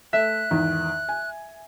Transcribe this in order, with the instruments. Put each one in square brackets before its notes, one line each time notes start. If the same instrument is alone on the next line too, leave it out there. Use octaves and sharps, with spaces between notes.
[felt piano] A3 [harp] E5 [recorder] F#6
[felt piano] E2 G#2 D#3
G#5